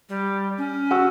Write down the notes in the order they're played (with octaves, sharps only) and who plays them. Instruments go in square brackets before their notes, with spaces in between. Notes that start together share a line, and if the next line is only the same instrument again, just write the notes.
[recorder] G3
C#4
[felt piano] F#4 E6